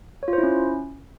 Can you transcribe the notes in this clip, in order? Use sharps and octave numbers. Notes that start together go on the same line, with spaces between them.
C#5
F4
C5
E4
C#4